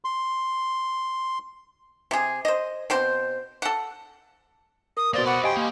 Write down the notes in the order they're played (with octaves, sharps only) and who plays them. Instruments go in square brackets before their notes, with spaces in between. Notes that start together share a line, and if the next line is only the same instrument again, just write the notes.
[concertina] C6
[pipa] C3 G#4
C5 D#5
B2 C4 C5
A4 F#5
[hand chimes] A#4 [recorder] D#6
[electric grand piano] B2 D#6 [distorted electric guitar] A#3 C6 [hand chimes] C5 [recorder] D5
[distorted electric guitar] D5 E5 [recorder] F#5 [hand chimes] B5 C#6 D6
[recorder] G4 [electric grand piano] D#5 G#5 C6 [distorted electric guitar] F5 G5
[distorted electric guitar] A#3